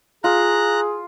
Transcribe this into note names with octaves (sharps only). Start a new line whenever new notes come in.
F4 G#4 A#5 F#6